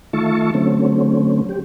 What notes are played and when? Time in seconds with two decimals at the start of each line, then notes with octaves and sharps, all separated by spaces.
0.13 D#3 A3 F4 E5 A5 C#6
0.54 D3 F#3 A3 C4 C#4
1.49 G4